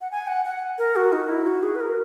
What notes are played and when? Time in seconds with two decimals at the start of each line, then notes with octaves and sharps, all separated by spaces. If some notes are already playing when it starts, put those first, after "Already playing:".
0.01 F#5
0.11 G#5
0.27 F#5
0.45 F#5
0.78 A#4
0.96 F#4
1.12 D#4
1.29 E4
1.47 F#4
1.63 G#4
1.75 B4
1.80 A#4